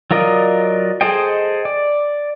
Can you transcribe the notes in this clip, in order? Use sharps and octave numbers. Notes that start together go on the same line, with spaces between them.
F#3 F4 A#4 D5 D#5
G#4 A4 C5 D#5 G5
D5